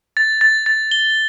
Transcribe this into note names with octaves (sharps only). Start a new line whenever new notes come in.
A6
A6
A6
G7